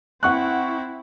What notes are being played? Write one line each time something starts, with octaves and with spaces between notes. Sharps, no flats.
C4 E4 F#5 C#6 F#6